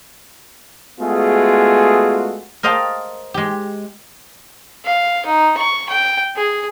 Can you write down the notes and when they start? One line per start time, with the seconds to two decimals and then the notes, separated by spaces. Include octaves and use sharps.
1.00 G#3 A3 B3 F4 F#4 G#4
2.63 A#4 C5 D#5 F5 G5 A5
3.34 G#3 G4
4.85 F5
5.26 D#4
5.57 C#6
5.90 G5
6.36 G#4